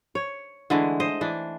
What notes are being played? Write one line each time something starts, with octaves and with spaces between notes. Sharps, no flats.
C#5
D3 E3 G#3 A3
C5 D#5
E3 D4